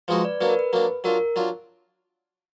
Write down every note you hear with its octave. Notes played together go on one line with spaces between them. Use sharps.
F3 G#3 D#4 F#4 B4
D5
F#3 A#3 D4 B4
A#4
B4
F#3 A#3 D4
F#3 D4 F4 A#4
F#3 D4 F4